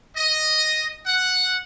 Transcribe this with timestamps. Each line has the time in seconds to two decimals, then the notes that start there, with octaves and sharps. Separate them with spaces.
0.17 D#5
1.06 F#5